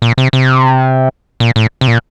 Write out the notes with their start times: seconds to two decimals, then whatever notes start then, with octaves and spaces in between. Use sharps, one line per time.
0.02 A#2
0.18 C3
0.33 C3
1.40 A#2
1.56 A2
1.81 C3
1.88 A#2